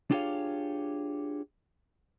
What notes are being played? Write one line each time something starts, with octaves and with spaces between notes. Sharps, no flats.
D4 F4 G4 G#4 C#5 F5